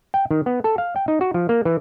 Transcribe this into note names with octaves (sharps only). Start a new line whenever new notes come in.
G5
D#3
B3
A4
F5
G5
D#4
F#4
F3
A#3
E3